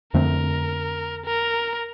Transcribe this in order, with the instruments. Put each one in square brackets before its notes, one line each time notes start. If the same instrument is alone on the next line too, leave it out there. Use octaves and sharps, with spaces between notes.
[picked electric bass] F2 D3 A3 C4 [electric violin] A#4
[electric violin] A#4